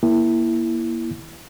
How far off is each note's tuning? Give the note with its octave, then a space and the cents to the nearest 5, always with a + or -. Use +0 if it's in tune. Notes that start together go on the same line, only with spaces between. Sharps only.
A#3 +25 E4 +0